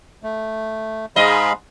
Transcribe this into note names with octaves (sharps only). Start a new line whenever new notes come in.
A3
G#2 G#3 D#5 F5 B5